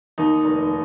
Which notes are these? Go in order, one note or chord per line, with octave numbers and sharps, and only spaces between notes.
D#2 D#4
F1